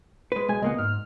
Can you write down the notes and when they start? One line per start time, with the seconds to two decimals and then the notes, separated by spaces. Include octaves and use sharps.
0.32 G#3 B4
0.48 B1 G#3 G#5
0.62 C#2 A#3 B3 D#5
0.78 G#2 F6